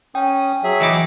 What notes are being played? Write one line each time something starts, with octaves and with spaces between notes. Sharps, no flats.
C#4 G5 D#6
F#3 G#4 E5
E3 D#4 D6